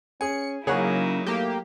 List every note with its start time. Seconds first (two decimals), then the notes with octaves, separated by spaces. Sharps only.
0.21 C#4 G#4 G#5 C#7
0.67 C#3 F#3 A#3 D#4 E4 G#4 C#5 F#5
1.26 A3 A#3 G4